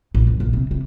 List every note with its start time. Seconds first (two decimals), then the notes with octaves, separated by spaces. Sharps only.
0.15 A#1
0.27 F#2
0.40 A#1
0.53 C3
0.71 C3